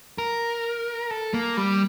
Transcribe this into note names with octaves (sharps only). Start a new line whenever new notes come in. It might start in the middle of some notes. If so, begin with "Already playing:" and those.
A#4
A4
A#3
G3